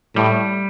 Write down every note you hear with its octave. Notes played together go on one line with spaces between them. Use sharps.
A2 G3